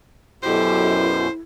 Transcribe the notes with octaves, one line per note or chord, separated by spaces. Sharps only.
F#2 B2 E4 G4 A4 C5